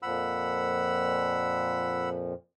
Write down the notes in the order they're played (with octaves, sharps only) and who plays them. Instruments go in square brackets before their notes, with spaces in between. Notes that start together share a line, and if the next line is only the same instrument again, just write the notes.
[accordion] F2 A#2 F3 [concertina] F#5 B5 E6